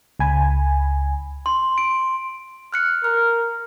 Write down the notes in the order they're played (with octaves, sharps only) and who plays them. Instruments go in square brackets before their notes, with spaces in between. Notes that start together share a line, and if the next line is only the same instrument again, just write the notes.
[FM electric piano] C#2 G#5 B5
[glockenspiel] C6
D7
[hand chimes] F6 F#6 C#7
[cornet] A#4 [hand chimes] F6